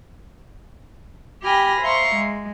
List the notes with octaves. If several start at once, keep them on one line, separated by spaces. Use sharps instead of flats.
G4 G5 G#5 B5 F6 A#6
C5 E5 F5 A#5 C6 C#6
G#3